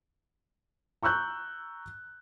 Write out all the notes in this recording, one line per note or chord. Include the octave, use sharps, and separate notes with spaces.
A#5 C#6 E6 F#6 G6